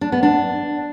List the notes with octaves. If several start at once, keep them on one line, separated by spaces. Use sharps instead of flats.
D4
B3
D4